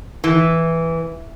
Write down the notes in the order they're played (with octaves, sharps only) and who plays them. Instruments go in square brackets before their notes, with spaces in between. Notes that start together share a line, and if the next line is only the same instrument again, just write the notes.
[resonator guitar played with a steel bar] E3